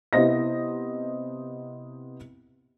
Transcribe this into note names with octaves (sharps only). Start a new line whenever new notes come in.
C3 B3 E4 C5 D#5 A#6